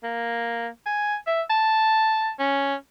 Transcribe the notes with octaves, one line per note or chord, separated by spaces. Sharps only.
A#3
G#5
E5
A5
C#4